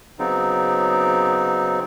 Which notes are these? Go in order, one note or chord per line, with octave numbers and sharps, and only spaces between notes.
C#3 F#3 B3 C4 D#4